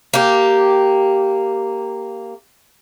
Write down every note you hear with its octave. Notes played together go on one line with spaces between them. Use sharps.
A#3 G4